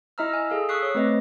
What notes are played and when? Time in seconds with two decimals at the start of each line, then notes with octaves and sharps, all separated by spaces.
0.18 E4 D#5 E5 A#5 E6 F6
0.29 G#5 E6
0.50 G#4 A4 F5
0.69 C#6 D#6 E6 F#6 B6 C7
0.82 C#5
0.95 A3 C4 B4 D#5